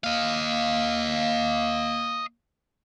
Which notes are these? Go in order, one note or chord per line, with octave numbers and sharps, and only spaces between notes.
A#3 D#5 F5